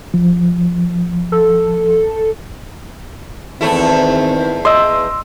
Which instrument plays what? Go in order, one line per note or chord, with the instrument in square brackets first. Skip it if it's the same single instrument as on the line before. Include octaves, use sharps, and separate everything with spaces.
[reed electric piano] F3
[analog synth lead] A4
[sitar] E2 A3 E4 [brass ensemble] D#3 C4
[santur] D#5 [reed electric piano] C6 E6